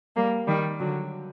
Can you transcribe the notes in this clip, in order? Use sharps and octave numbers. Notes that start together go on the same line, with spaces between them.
G3 A#3
D#3 G3
D3 F#3